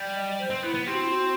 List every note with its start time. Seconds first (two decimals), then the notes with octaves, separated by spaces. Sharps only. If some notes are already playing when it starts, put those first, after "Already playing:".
Already playing: G3
0.15 D#5
0.38 C5
0.50 C4
0.62 B3 E4
0.74 B3
0.86 C4 G4
0.94 F#4
1.01 E4
1.08 F#4